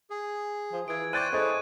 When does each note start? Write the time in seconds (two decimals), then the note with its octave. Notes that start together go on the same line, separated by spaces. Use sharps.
0.10 G#4
0.72 F3
0.88 E3 G#4 G#6 D7
1.13 C5 D5 G5 C#6 F#6 G6 A6 D#7
1.32 E4 G#4 A4 C5 C#5 D#5 F#6